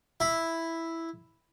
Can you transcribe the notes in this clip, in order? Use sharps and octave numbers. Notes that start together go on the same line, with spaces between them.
E4